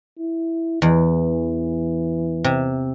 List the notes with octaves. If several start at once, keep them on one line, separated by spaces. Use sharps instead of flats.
E4
E2 E3
C3